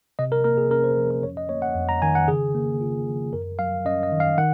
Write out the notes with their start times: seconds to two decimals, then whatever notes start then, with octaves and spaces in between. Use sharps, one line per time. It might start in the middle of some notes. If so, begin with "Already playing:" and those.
0.19 C3 D#5
0.32 A#4
0.44 A#3 A#4
0.58 G#4
0.71 C#4 A#4
0.84 C5
0.97 F3
1.11 A#4
1.23 F2 C#5
1.37 D#5
1.49 A#3 C#5
1.62 F#5
1.75 F2
1.89 A#5
2.02 D#3 G#5
2.15 F#5
2.28 C#3 G#4
2.55 A#3
2.81 F4
3.07 F3
3.33 F#2 A#4
3.59 F#3 F5
3.85 C#4 D#5
4.03 D#5
4.12 D#3
4.20 F5
4.38 D#3 F#5